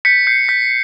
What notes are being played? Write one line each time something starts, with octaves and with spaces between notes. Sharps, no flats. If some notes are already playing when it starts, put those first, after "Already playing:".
G6 B6 C#7
G6 C7
G6 B6